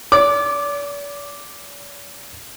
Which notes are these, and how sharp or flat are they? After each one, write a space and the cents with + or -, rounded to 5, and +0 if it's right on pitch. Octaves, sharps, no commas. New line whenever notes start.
D5 -45 D6 +0